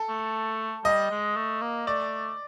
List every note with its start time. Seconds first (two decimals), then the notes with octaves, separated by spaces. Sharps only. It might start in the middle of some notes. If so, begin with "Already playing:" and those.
Already playing: A4
0.09 A3
0.84 G3 D#5
1.11 G#3
1.36 A3
1.62 A#3
1.87 A3 D5